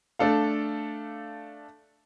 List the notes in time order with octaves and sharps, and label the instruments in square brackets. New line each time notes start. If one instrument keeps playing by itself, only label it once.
[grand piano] A3 D4 A4 F5